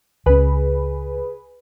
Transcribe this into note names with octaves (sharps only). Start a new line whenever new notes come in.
C#2 C#4 G#4 B4